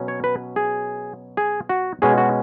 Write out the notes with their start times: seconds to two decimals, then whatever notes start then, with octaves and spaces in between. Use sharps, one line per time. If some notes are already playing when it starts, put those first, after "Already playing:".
Already playing: B2 F#3 C#4
0.08 C#5
0.24 B4
0.56 G#4
1.37 G#4
1.69 F#4
2.02 B2 G#3 C#4 G#4
2.18 F#4